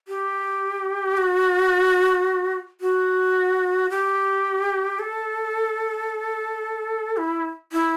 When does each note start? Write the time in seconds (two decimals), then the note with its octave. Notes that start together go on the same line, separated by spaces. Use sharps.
0.08 G4
1.17 F#4
2.81 F#4
3.90 G4
4.99 A4
7.17 E4
7.72 E4